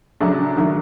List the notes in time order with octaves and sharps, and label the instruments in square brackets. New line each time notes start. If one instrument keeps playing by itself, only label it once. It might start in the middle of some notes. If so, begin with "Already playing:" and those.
[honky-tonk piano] C#3 F#3 A3 D4
D#3 F#3 A3 D4